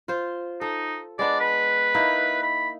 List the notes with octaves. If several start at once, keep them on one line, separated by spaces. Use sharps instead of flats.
F4 C5
D#4 A4
G#3 B3 D4 D5
B4
A#3 D#4 E4
B5